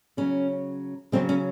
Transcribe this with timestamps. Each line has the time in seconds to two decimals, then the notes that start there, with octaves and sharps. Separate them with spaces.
0.17 C#3 F#3 C#4
1.12 C#3 F#3 C4
1.29 C#4